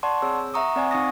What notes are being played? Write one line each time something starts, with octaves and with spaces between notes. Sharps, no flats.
D5 F#5 A5 C6 C#6
C4 G#4 C#5 E6
E5 F#5 A#5 C#6 D#6
C4 D5 F#5 G#5
C4 D#4 F5 C#6 D#6 A#6